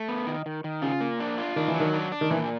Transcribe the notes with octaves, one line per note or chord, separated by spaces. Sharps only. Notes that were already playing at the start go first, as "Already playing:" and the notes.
Already playing: A3
B3
D#3
D#3
D#3
C#3 F4
A#3
D4
F4
D#3 D4
E3
F#3
D#3
D4
D4
D#3
A#2 E3